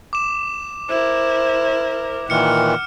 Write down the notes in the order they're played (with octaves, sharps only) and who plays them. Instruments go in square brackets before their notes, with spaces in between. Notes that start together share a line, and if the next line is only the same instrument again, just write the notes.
[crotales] D6 E7
[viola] E4 A#4 [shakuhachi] C5
[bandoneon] A#2 D#3 E3 [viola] F#5 [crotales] F6 C#7